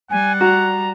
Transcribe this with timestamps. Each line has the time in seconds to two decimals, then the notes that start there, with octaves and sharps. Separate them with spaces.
0.11 G3 F#5 G#5
0.41 F#4 A#5